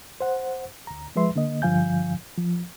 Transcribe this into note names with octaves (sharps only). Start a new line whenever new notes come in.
C5 F#5
D2 A#5
F3 G#3 B4 E5 C6
D3 A#3 D#5
G2 D3 F3 F5 G#5 G6
F3